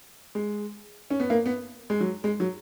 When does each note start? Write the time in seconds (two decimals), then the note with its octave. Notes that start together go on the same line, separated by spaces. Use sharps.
0.35 G#3
1.10 C#4
1.20 B3
1.30 A#3
1.46 B3
1.90 G#3
2.00 F#3
2.24 G#3
2.40 F#3